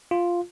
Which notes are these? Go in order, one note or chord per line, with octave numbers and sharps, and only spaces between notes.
F4